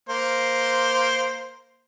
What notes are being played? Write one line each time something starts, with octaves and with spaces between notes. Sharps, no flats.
A#3 C5